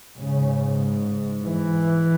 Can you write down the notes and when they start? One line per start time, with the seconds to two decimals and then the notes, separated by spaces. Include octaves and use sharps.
0.16 G#2 C#3
1.42 E3